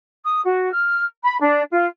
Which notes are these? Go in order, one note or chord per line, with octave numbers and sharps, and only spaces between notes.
D#6
F#4
F6
B5
D4
F4